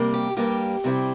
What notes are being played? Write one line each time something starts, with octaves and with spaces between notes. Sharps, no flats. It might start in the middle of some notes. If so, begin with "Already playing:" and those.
Already playing: C3 G3 A#3
G4
G2 G3 A#3 G4
C3 G3 C4 E4